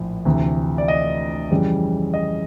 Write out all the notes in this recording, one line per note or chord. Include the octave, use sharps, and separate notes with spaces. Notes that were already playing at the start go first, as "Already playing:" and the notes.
Already playing: A#1 A2 F3
D2 C3 E3
D5
D#5
F2 C#3 E3 G3
D#5